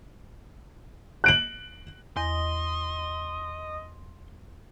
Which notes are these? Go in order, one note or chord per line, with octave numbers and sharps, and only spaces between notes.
F#6 D7 F#7
E2 D#5 C6